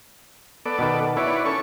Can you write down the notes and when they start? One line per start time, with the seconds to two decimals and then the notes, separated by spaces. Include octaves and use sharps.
0.65 B3 A4 D5
0.79 B2 D#3
1.17 E4 B4 C#5 D5
1.45 C#4 A4 C#6